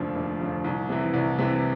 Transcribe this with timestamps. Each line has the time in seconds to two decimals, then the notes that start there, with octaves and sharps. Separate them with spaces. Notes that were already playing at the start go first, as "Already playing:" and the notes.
Already playing: F1 D#2 D3 F3
0.15 F1
0.40 D#2 D3 F3
0.64 C2
0.89 C3 E3
1.13 C2
1.38 C3 E3